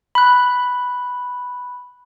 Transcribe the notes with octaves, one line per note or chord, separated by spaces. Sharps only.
B5 F#6